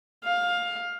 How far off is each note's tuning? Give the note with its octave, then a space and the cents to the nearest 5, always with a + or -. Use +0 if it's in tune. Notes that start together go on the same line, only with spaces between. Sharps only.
F5 +15